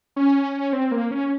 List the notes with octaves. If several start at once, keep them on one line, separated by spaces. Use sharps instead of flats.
C#4
C4
A#3
C#4